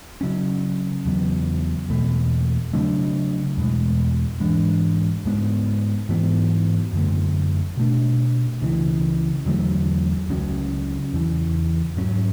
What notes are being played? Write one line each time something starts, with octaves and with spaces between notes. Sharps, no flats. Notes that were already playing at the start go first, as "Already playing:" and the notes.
C#3 F#3 C#4
E2 C#3 F#3 B3
E2 B2 A3
C#3 F#3 A3 D4
E2 B2 G#3
G#2 E3 G#3 D4
G#2 G#3 B3
G#2 E3 B3
F#2 D3 A3
B2 A3 D4
C#2 C#3 E3
E2 D3 F#3 A3
C#2 C#3 F#3 C#4
E2 C#3 E3
G#2 F#3 C#4